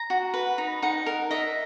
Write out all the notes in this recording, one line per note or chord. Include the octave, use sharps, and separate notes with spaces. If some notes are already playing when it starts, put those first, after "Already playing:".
Already playing: A#5
F#4
B4
D#4
D#4 F#5
A#4
D#5 E5